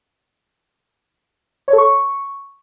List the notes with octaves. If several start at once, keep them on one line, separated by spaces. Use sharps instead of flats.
C#5
A4
C#6